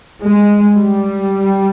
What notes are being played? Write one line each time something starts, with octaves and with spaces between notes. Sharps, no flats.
G#3
G3